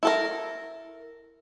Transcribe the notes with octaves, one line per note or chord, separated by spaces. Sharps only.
E4 A4 A#4